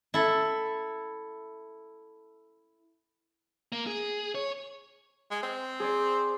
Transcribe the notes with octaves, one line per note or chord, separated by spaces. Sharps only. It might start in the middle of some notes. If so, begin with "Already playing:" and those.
E4 A4
A#3
G#4
C#5
G#3
C4
G#4 C5 D5